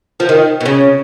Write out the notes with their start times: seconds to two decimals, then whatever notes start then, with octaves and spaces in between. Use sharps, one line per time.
0.20 F3
0.29 D#3
0.61 B2
0.65 C#3